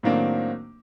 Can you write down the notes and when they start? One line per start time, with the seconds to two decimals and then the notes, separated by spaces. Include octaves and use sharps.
0.03 A2 D#3 F#3 A#3 C4 D4